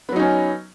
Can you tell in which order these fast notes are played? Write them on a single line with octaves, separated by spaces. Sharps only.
B3 F#3 D#4 C#4